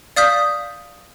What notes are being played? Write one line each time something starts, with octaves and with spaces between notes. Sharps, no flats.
D5 F5 D#6 F6 G6 B6